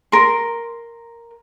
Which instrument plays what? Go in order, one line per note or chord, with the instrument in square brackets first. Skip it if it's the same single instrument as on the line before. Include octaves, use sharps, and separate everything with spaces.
[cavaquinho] A#4 C6